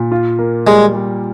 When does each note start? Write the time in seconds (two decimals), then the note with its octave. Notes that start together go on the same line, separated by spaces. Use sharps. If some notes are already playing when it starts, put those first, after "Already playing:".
Already playing: A#2
0.12 F4
0.39 A#3
0.67 G3 G#3
0.95 G3